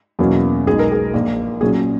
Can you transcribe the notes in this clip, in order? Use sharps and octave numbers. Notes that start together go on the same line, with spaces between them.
E2 B2 F#3 A#3 C#4
B1 B2 G#3 D#4 G#4
A#4
G#4
A#1 A#2 A#3
A#2 F#3 C#4 G#4